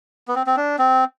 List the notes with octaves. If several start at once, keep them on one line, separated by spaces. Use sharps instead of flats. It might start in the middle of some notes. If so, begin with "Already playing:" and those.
B3
C4
C4
D4
C4